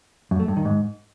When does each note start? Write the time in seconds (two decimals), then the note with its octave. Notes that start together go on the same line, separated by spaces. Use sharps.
0.31 F#2
0.40 A3
0.48 G2
0.57 D#3
0.65 G#2